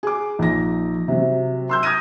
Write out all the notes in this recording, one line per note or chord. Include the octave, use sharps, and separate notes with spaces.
G#4 D6
A#1 D#4 A#6
C3 F#3
C6 E6 G6
D#6 F6 G#6 A#6 D#7